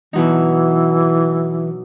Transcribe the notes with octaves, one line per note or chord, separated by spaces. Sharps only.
B2 E3 F#3 D#4